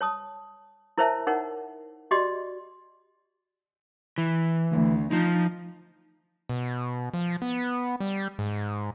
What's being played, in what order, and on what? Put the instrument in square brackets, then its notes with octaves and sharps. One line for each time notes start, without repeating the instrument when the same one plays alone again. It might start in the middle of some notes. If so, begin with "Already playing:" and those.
[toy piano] C#5 A5 D#6
E4 A#4 C5 C#5 E5 A5
D#4 A#4 C#5 F#5
F#4 G4 D5 D#5 C6
[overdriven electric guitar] E3
[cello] D2
[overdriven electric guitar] F3 [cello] D#4
[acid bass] B2
F3
B3
G3
G#2